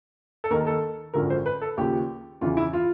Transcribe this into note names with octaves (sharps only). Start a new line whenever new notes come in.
A4
D#2 D#3 A#4
A4
G#1 F#2 D3 F3 A#4
C5
B4
A4
D#2 C#3 F3 G4
E2 C#3 E3 F4
E4
F4